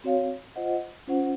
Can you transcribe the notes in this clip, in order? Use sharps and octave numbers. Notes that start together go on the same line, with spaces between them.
C4 F#4 C#5 F5
F4 C5 D#5 F#5
C#4 F4 C5 F#5